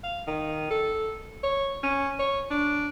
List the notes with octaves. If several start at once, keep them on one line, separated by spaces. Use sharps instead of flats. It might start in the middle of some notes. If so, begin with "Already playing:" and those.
F5
D#3
A4
C#5
C#4
C#5
D4